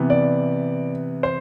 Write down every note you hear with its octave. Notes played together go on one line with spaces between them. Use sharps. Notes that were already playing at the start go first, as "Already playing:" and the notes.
Already playing: C3 E3 B3
D5
C5